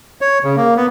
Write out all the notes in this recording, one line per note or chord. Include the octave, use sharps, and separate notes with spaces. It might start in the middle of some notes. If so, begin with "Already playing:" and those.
C#5
C#3
A#3
B3